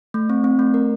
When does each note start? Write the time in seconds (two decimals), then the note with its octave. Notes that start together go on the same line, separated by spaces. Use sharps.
0.14 A3
0.30 C4
0.44 C4
0.59 A3
0.74 A#4